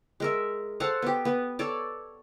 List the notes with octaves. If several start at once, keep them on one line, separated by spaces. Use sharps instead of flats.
G#3 A#4 E5
A4 C5 F5 F#5
B3 G4
B3
A4 C#5 D5